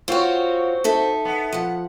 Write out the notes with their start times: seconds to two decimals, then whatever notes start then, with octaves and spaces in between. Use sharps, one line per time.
0.08 C4 F4 F#4 C#5
0.84 D#4 A4 E5
1.25 B3
1.52 F3 F#5